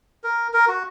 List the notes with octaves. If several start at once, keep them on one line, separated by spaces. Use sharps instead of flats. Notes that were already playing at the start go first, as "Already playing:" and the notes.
A#4
A#4
F#4